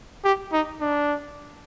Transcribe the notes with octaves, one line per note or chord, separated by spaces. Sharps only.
G4
D#4
D4